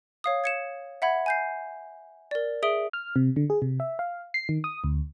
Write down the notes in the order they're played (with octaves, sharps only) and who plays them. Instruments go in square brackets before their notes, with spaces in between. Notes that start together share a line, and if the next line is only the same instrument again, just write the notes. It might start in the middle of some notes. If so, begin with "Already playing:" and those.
[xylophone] C#5 F5 D#6
G#6 C#7 E7
E5 F#5 B5 G#6
G#5 G6 C7
A#4 D5
G#4 E5 D#6 D7 G7
[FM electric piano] F6
C3
D3
G#4
C3
E5
F5
C7
D#3
D#6
D2